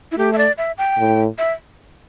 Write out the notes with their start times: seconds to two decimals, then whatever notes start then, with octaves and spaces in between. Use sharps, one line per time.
0.12 E4
0.17 A3 G4
0.33 E5
0.38 D5
0.58 E5
0.78 G5
0.98 A2
1.38 E5